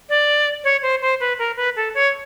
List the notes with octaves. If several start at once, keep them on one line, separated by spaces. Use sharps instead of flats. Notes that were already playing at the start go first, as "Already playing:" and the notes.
D5
C#5
C5
C5
B4
A#4
B4
A4
C#5